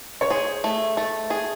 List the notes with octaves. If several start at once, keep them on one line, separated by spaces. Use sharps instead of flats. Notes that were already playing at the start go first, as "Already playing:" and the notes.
C#5
G#4 C5
A3
A3
G#4